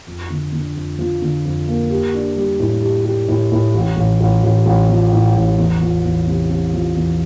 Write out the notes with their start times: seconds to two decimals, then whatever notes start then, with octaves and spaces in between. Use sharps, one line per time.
0.07 F2
0.30 D3
0.52 D3
0.75 F2
0.98 F3
1.22 D3
1.45 F2
1.67 A#3
1.90 G4
2.14 D4
2.36 G3
2.60 A2
2.82 G4
3.05 G4
3.28 A2
3.52 A2
3.74 A1
3.97 A1
4.20 A1
4.43 A1
4.66 A1
4.89 F3
5.12 A2
5.35 A1
5.58 E2
5.80 F3
6.04 E2
6.27 C3
6.50 C3
6.73 F3
6.96 E2